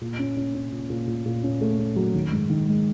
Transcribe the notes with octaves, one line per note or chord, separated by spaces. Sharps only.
A#2
C#4
C#4
C#4
A#2
A#2
A#2
A#2
C#4
A3
A3
F#3
D#3
G#2
D#3
G#3